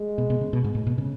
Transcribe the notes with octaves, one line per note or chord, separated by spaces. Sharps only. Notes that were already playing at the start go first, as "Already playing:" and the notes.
Already playing: G#3
B2
B2
C#3
B2
G#2
A2
B2
C#3